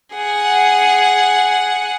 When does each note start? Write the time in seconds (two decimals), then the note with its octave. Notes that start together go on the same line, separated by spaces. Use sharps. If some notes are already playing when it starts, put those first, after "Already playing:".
0.14 G#4 F#5